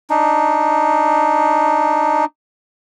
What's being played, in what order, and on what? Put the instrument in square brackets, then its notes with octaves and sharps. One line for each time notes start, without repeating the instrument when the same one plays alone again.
[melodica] D4 D#4